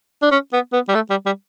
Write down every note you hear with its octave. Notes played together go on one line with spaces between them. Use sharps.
D4
C#4
B3
B3
G3
A3
G3
G3